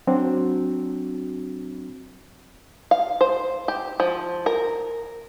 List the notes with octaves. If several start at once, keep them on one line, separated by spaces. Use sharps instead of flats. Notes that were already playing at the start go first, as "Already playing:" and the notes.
F#3 C4 D4 F#4
F5
C5
G4
F3
A#4